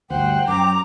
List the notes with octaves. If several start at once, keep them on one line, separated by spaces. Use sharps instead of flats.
D2 G2 C5 F#5 G5
F#2 A#5 D6